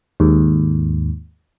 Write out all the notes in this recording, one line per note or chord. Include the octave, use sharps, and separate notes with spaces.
D#2 G#2